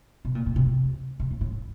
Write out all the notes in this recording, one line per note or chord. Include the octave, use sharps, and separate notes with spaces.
B2
A#2
A#2
C3
C3
B2
A2
A2